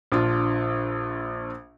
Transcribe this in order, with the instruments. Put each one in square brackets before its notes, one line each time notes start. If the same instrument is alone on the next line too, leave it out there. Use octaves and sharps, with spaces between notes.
[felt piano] A#1 D4 F4